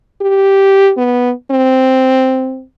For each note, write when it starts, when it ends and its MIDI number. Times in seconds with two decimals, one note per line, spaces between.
0.21 0.92 67
0.97 1.32 59
1.51 2.63 60